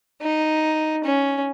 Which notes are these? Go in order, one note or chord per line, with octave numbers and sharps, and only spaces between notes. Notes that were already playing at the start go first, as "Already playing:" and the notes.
D#4
C#4